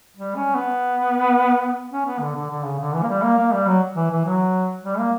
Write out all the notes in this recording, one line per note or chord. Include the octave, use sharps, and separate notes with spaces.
G3
C#4
B3
C#4
B3
D3
D3
D3
C#3
D3
E3
A#3
G3
A#3
A#3
G3
F#3
E3
E3
F#3
G3
A#3